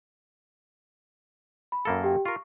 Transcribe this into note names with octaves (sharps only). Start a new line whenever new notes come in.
B5
F#2 A#3 A4
G4 G5
F4 A#4 C#6